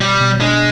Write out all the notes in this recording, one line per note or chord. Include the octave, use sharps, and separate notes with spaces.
B2 G3
B2
G#3 D4